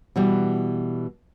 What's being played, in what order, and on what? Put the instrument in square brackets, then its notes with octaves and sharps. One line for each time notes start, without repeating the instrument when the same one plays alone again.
[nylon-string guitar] B2 E3 G3